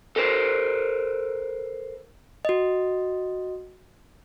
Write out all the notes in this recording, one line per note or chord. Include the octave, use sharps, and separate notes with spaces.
A4 A#4 C5
F#4 D#5